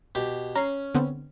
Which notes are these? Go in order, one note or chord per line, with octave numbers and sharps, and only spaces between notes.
B2 G4
C#4 A#5 C7
D3 B3 C4